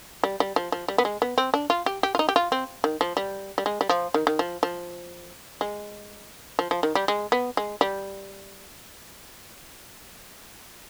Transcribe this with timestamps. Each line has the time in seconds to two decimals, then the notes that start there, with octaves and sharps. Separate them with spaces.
0.24 G3
0.40 G3
0.56 F3
0.72 F3
0.88 G3
0.98 B3
1.05 G#3
1.22 B3
1.38 C4
1.54 D4
1.70 F4
1.86 G4
2.03 G4
2.15 F4
2.19 D#4
2.29 G4
2.36 F4
2.52 C4
2.84 D#3
3.01 F3
3.17 G3
3.58 G3
3.66 G#3
3.81 G3
3.89 F3
4.14 D#3
4.27 D#3
4.39 F3
4.63 F3
5.61 G#3
6.59 F3
6.71 F3
6.83 D#3
6.95 G3
7.08 G#3
7.32 B3
7.57 G#3
7.81 G3